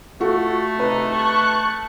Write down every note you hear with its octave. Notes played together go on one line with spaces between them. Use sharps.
A3 F4 F#4 A4
C3 D#4 B4
A5 C#6 F#6